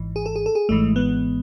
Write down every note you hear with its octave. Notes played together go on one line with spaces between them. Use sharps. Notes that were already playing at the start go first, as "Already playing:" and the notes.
Already playing: G#1 G#2 E3
G#4
A4
G#4
A4
G#4
G#1 G#2 E3 G#3 A3
B3